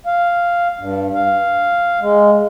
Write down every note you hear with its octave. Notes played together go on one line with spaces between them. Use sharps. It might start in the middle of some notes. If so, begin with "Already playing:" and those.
F5
G2
F5
G#3